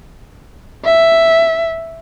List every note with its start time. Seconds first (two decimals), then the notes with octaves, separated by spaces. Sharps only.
0.86 E5